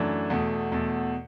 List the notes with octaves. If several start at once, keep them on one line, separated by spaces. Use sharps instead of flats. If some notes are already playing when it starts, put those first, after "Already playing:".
Already playing: F#2 E3 A3 D4
E2 B2 A3
E2 B2 A3